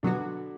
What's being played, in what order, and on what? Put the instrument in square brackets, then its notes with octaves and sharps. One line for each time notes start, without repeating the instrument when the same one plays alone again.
[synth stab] B2 F#3 B3 F#4 [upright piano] D3 D4